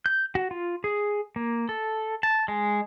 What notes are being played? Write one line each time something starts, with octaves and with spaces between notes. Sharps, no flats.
G6
F#4
F4
G#4
A#3
A4
A5
G#3